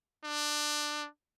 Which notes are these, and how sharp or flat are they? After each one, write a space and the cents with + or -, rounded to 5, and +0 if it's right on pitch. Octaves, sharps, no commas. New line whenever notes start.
D4 +20